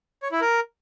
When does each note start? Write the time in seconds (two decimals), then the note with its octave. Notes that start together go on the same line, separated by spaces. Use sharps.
0.22 C#5
0.32 E4
0.41 A#4